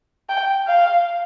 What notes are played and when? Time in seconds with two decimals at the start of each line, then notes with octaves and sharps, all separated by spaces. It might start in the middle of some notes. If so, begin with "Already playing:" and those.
0.29 G5
0.67 F5